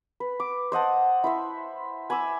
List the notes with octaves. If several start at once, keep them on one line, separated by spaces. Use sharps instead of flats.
B4
D6
C5 D#5 F#5 A5
E4 C5 E5
G#5 B5 D6 E6